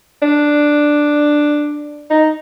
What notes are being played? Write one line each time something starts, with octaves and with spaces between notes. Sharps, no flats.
D4
D#4